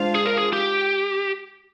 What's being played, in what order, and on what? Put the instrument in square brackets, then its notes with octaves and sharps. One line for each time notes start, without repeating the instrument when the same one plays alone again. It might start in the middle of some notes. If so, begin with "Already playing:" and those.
Already playing: [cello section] G#3 D4 F4 C5 F5
[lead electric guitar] G#4
A#4
G#4
G4